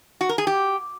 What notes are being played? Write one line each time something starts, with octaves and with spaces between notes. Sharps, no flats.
F#4
A#4
G#4
G4